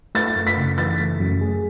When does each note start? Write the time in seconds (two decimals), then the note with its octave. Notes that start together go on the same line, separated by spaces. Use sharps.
0.15 A3 A6
0.36 F#2
0.47 B6
0.57 C#3
0.78 E3 A6
1.00 A3
1.20 F#2
1.41 G#4